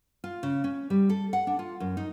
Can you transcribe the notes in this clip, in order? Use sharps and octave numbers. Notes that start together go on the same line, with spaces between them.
F4
C#3
C#4
G3
A4
F#5
D4
F4
F#2
D#4